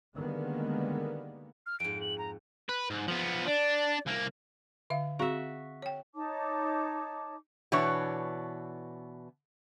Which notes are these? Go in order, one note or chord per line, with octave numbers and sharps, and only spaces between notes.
D3 D#3 G3 G#3 A#3 B3
F6
F2 G#2 D7
F#7
A#5
B4
G#2
F3 B3
D4 D5
C2 A#3
D3 E5 F5
C4 F#4 G#4 E5 F5
C#5 G5
D#4 C#5 A5 D6
B2 E3 B3 D4 C#5